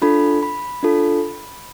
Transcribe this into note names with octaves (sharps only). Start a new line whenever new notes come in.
D4 F4 A4 B5
B5
D4 F4 A4